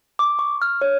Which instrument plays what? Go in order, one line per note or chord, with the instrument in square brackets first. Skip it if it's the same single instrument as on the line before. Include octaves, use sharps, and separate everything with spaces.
[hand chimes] D6
C#6
F6
C#5